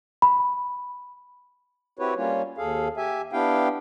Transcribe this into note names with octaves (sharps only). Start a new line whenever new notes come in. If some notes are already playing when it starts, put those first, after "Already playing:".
B5
C4 E4 F#4 G4 B4 C#5
G3 A#3 C#4 F4 C#5
D#2 G#4 A4 F5
G4 E5 G#5
B3 D4 E4 G4 F5 G5